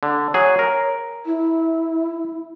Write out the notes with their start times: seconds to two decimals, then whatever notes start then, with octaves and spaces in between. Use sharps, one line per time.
0.03 D3
0.34 F#3 G#4 C#5
0.59 A#4
1.26 E4